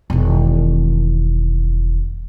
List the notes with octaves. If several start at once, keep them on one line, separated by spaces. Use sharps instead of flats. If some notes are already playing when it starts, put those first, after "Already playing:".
E1 D#3